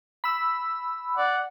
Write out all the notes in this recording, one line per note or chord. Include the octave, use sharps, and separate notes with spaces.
B5 E6
D5 F#5